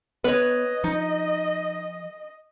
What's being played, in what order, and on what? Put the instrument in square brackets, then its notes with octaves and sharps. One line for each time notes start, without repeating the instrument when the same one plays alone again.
[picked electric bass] B3 [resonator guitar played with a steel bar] B4 C#5 [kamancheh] D#5
[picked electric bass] F3 [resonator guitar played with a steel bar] D#4